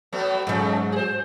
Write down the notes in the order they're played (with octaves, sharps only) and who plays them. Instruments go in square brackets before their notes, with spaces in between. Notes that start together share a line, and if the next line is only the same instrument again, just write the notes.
[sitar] F#3 A3 B3
[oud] G#2 F#3 [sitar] C#3 A3
[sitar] G#4 C5